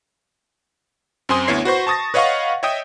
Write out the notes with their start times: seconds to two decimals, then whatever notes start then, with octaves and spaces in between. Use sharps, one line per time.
1.29 F#2 C4 G#5 C6 D#6
1.47 D2 B3 E4 C#5 C7
1.65 F#4 B4 C5 C#6
1.87 A5 C#6 D#6 A6 A#6
2.14 B4 C#5 D#5 F5 F#5 C#6
2.63 C#5 D#5 E5 G5 D#6 G6